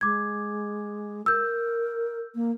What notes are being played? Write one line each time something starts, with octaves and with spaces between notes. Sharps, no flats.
G#3 D6 G#6
A#4 E6 G6
A#3